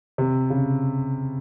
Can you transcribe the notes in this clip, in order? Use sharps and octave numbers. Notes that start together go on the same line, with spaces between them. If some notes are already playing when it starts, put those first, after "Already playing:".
C3
C#3